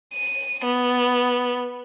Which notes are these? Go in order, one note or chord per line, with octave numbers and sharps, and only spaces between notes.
D#7
B3